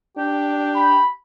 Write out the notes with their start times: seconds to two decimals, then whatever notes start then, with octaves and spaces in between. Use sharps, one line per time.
0.17 D4 G4
0.75 B5